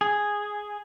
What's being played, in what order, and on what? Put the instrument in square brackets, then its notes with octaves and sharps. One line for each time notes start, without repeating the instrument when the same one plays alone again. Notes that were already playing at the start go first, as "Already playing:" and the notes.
[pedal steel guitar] G#4